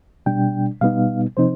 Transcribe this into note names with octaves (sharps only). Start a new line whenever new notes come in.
B2 G3 D4 G5
B2 G3 B3 D#4 F5
C3 F3 C4 D#4 C5